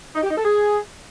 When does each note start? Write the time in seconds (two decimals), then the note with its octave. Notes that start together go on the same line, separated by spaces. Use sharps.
0.15 D#4
0.23 G4
0.30 D#4
0.37 A4
0.45 G#4